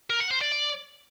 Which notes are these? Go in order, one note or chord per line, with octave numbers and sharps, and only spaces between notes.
A#4
F#5
C5
D5
D5